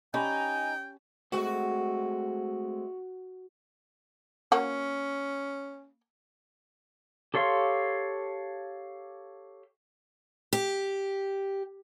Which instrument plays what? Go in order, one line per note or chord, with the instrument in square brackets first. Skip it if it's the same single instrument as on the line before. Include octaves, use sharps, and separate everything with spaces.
[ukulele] C#4 G4 B5 [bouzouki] D#4 [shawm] G5 [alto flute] G#5
[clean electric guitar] G#3 A3 C4 [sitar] F#4
[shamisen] A#3 F#4 [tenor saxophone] C#4
[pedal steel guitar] G4 A4 C#5 F5 C6
[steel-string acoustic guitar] G4